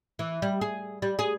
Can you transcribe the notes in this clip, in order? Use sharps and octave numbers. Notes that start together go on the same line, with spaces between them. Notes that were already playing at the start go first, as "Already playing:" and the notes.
E3
G3
G#4
G3
G#4